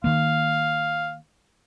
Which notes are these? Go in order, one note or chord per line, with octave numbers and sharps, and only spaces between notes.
D#3 A#3 F5